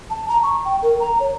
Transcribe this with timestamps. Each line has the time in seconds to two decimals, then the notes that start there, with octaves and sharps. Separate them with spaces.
0.10 A5
0.29 A#5
0.43 C#6
0.65 G5
0.83 A#4
1.00 A#5
1.20 C#5